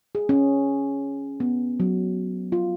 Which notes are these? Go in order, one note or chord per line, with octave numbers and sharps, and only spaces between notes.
G#4
C#4
B3
F#3
F4